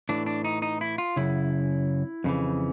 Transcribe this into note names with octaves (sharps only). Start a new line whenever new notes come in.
A2 E3 D4
D4
D#4
D#4
E4
F4
F#2 C#3 E4
F2 C#3 E3